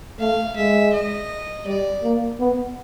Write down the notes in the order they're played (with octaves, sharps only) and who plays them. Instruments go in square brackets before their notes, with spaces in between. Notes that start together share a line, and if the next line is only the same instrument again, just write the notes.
[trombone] A3 [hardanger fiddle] F5
[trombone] G#3 [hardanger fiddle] E5
[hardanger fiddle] D#5
[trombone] G3 [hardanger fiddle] D5
[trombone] A#3
B3